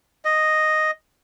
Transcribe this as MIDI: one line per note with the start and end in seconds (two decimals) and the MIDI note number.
0.25 0.91 75